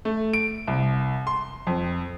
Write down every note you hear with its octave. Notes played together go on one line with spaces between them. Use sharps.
A3
D7
C2
C6
F2